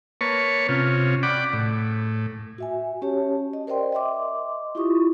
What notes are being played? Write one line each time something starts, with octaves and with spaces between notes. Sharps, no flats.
A#3 B4 C#5 A5 C#6
C3 C#4 F4
D5 F#5 G5 B5 D6
A2
F#4 E5 G#5
C#4 G4 C#5 A5
D#5
A#4 C5 D5 D#5 G5 C6
D#5 E5 C6 D6
E4 F4 G4 C#6 D#6